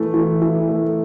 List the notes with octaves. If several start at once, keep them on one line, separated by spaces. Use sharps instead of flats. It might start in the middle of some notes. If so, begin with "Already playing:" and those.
Already playing: E3 A3
E3
E3
A3